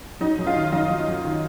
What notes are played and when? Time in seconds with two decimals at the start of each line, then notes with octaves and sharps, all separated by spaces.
0.21 F#3 D#4 D#5
0.38 F#2
0.47 F4 F5
0.56 D#3
0.72 F#2 D#4 D#5
0.90 F#3
1.08 F#2
1.25 D#3